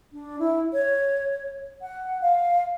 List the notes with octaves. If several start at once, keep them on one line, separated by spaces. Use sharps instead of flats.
D4
E4
C#5
F#5
F5